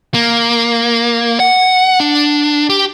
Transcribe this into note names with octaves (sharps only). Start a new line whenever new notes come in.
A#3
F#5
D4
G4